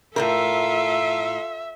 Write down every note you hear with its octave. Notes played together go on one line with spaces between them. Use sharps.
A2 D#3 F4 A4 A#4 E5